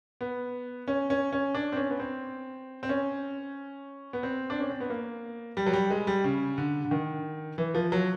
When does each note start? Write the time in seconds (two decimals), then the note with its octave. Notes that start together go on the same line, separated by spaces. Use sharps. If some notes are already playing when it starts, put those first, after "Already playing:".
0.21 B3
0.88 C#4
1.10 C#4
1.32 C#4
1.55 D4
1.72 C4
1.77 C#4
1.90 B3
2.00 C4
2.83 C4
2.89 C#4
4.13 B3
4.23 C4
4.50 D4
4.60 C#4
4.70 C4
4.80 B3
4.90 A#3
5.57 G3
5.66 F#3
5.73 G3
5.91 G#3
6.07 G3
6.24 C#3
6.58 D3
6.85 D3
6.91 D#3
7.58 E3
7.75 F3
7.92 F#3